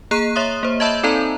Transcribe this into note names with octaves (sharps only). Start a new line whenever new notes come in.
A#3 G#4 A#5 F#6 C7 D#7
C#5 E5 C6 D#6
A#3 C5
D#5 E5 A5 B5 E6 G6
C4 D#4 A4 D5 A5 A#5